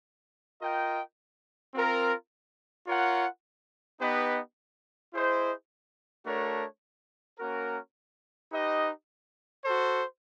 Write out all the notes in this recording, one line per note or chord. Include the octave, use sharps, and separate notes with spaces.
F4 A#4 D#5 G5
C4 F4 A#4
F4 A#4 C#5 F#5
B3 D#4 G4 B4 D#5
E4 G#4 C5 D#5
A3 D4 F#4 A#4 C#5
A#3 C#4 F#4 A#4
D#4 G4 B4 D#5
F#4 A4 C5